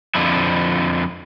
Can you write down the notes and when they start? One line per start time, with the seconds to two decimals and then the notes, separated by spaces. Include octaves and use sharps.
0.15 F2 D3 F3 E4